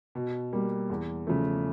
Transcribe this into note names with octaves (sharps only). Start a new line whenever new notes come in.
B2
G3 A#3
E2
C#3 F3 A3